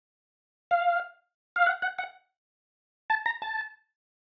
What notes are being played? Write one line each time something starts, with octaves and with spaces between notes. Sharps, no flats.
F5
F5
F#5
F#5
F#5
A5
A#5
A5